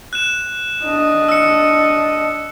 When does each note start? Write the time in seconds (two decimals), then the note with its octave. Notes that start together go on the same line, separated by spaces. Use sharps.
0.13 F#6 E7
0.84 D4 D#5
1.28 E6 C#7